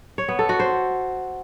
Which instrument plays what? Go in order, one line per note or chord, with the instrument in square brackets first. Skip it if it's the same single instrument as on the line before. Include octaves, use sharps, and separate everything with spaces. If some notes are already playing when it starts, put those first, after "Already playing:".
[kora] C#5
B3
A4
F#4
C5